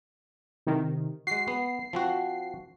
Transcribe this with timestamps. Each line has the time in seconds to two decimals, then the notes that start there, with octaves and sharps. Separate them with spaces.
0.67 C3 D#3
1.27 G#3 F#4 C7
1.48 B3
1.93 F3 C4 F#4